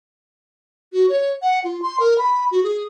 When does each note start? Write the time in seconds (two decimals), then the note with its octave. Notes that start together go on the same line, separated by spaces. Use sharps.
0.93 F#4
1.09 C#5
1.42 F#5
1.64 F4
1.82 C6
2.00 A#4
2.18 B5
2.51 F#4
2.63 G#4